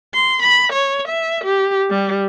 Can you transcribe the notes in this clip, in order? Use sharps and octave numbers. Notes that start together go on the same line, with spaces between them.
C6
B5
C#5
E5
G4
G3